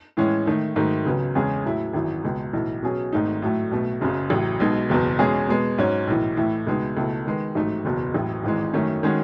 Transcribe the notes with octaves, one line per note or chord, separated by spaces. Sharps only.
A2 E3 G#3 C#4
D#3 A3 D#4
G#2 D#3 F#3 A3
C#2 C#3 F#3 B3
E2 C#3 G#3 C#4 G#4
A2 F#3 A3 E4
G#1 F#2 E3
C#2 B2 G#3
B1 A2 E3
B2 F#3 C#4 G#4
G#1 G#2 D#3 A3 D#4
A2 F#3 A3
B1 B2 A3
F#1 F#2 C#3
A1 A2 F#3
B1 B2 G#3 D#4
F#1 E2 B2
E2 B2 G#3 C#4 G#4
B2 G#3 B3
G#2 F#3 C#4 F#4 C#5
B1 A2 E3
A2 E3 A3 E4
C#2 B2 G#3 B3 D#4
C#2 B2 A3 E4 A4
D#3 G#3 B3
A1 G#2 F#3 A3 D#4
F#1 E2 B2 F#3
A1 A2 F#3
G#1 G#2 E3 G#3
F#2 D#3 F#3 A3 C#4
D#3 G#3 C#4 F#4